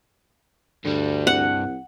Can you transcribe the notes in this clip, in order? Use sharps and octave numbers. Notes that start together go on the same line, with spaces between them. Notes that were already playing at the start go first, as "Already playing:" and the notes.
D2 G2 D3 G3
C2 F#5